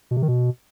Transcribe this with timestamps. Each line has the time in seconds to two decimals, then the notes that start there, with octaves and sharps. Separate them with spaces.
0.11 B2
0.17 C3
0.22 D#3
0.28 B2